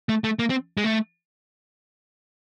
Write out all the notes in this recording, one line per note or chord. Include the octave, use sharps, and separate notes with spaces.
A3
A3
A#3
C4
G#3
A3